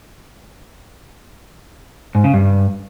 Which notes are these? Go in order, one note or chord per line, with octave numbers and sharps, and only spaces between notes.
G#2
C#3
G2